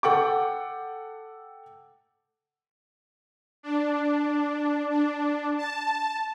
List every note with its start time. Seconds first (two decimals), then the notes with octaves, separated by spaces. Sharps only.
0.03 A4 F#5 G5 D6
3.63 D4
4.90 D4
5.58 A5